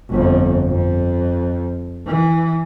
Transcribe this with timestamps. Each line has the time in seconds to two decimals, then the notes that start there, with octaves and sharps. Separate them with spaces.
0.10 G1 F2
0.69 F2
2.07 E3